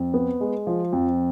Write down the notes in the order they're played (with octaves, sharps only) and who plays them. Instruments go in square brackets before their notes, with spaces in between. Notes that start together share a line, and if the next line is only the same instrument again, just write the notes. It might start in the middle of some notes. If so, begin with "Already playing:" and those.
Already playing: [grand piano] F2
B3
G#3
F3
F2